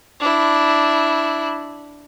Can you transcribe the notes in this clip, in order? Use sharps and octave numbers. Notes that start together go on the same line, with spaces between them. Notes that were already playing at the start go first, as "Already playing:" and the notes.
D4 E4